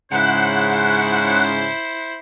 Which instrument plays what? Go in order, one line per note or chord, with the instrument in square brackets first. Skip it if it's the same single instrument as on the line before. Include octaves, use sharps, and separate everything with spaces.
[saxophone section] G#2 C#3 [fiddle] E4 [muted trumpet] C5 [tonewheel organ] F#5